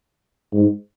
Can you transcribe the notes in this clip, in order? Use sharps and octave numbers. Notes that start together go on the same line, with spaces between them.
G#2